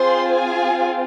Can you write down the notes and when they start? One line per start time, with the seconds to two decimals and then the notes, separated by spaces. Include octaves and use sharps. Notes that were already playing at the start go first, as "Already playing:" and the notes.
Already playing: C4 F4 G#4 C5 C6
0.34 G#4 G#5